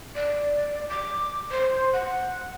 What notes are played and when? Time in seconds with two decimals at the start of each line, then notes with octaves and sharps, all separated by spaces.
0.15 D5
0.90 D6
1.51 C5
1.93 F#5